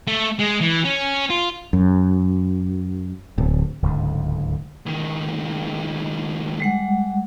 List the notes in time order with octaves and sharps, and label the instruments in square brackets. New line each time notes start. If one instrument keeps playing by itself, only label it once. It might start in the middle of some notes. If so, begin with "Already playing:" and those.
[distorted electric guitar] A3
G#3
E3
C#4
F4
[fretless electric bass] F#2
D1
[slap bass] D1 C#2 G#2 D3
[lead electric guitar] C#2 D#3
[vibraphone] G3 G#3 F#5